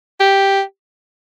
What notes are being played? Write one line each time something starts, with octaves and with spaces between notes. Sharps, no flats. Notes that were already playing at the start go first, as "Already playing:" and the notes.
G4